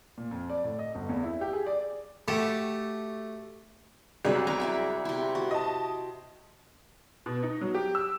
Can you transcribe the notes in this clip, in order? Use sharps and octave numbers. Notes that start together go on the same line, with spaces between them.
A#2
F2
D5
A2
D#5
G1
E2
E4
G4
G#4
D5
A3 F#4 G4 A4
C2 F#3 G#3 D4 G#4 B4
D5 G#5 A#5
E4 D5 E5
C3 E4
F#4
D#5 A5
B2
D#4
F#3
G4
E6